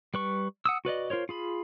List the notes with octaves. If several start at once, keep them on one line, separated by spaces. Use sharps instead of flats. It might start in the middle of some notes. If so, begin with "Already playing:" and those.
G3 B4 C#6
F#5 D#6 E6
F#4 B4 D5 D#5
F4 A#4 C5 C#5
F4 G#4 B5